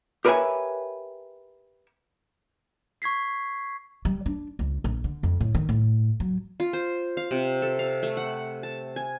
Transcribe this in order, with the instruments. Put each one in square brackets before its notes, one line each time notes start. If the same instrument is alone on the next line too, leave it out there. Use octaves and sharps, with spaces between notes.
[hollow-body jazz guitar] G4 A#4 B4 C#5 E5 G#5
[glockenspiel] C#6 G#6 B6 C7
[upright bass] G3
D4
C#2
A#1
D3
F2
A2
D#3
A2
F#3
[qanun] F4
C5
F5
C3
A4
F5
A3
F#5
A5
G#5